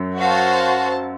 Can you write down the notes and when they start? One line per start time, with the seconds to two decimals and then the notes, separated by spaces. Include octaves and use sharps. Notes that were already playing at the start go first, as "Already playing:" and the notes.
Already playing: F#2 F#3
0.19 F#4 C5 F5 A5